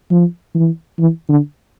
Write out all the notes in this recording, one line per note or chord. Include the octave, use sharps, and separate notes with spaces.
F3
E3
E3
D3